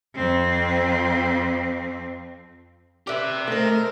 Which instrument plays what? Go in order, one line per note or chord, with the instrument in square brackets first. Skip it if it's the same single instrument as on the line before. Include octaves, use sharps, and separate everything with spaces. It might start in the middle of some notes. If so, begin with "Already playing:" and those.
[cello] F2 C4
[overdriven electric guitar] G4 E5 [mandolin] B4 D5
[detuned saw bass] A3 [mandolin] D#4 A4 [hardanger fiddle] A#4 C5